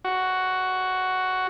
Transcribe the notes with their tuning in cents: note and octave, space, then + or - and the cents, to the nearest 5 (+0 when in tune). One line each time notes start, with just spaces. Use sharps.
F#4 +5